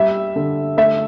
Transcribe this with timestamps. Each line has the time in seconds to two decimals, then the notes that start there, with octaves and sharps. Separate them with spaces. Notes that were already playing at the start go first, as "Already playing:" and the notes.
Already playing: G3 E5
0.36 D3
0.77 A3 E5